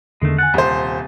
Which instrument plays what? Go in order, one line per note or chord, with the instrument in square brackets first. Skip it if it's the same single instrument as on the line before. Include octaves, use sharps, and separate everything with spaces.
[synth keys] E2 D3 D#3 [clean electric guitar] G#3 A3
[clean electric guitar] F#5 [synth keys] G#5 A6
[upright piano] D#1 C5 [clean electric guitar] C3